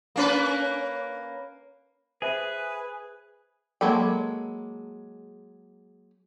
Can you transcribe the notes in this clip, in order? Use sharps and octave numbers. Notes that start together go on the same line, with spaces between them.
A#3 C#4 B4
G#4 B4 C5 E5
F#3 G#3 A#3 A4 B5